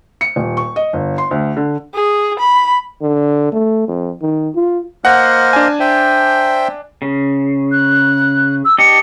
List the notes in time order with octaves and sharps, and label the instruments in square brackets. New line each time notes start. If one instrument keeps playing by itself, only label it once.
[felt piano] C#7
D#1
C#6
D#5
G1
C6
D2
D3
[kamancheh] G#4
B5
[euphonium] D3
A3
F2
D#3
F4
[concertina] A#3 C5 D#5 [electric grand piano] F#5
[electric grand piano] D4 G#5
[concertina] C5 E5 G5
[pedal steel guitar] C#3
[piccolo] F#6
E6
[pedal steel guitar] D4 G4 D#5 [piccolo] C#7